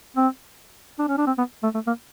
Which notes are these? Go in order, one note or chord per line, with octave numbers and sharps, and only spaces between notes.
C4
D4
C#4
D4
C4
B3
A3
A3
A#3